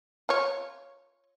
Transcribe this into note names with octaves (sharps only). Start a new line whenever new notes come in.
F4 C#5